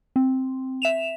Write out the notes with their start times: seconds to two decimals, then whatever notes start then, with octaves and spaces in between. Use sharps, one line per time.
0.16 C4
0.82 E5 E7 F7